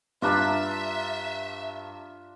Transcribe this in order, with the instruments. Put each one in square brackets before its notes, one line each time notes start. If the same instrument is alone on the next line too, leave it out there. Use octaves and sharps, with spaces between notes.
[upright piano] G2 A#5 [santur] D4 F4 [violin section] E5